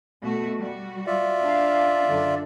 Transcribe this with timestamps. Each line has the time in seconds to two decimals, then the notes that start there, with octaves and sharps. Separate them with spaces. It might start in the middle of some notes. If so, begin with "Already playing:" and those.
0.22 B2 A3 F#4
0.57 G3 F#4
1.07 F4 D5 E5
1.43 D4 F5
2.06 F#2 D3 D4